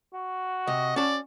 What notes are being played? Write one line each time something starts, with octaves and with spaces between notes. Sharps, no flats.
F#4
C3 D#5
C#4 D5 A5